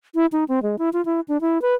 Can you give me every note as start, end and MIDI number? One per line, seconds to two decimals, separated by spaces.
0.15 0.26 64
0.32 0.44 63
0.48 0.62 60
0.63 0.76 56
0.79 0.90 64
0.93 1.04 65
1.05 1.20 64
1.28 1.40 62
1.41 1.61 64
1.62 1.75 71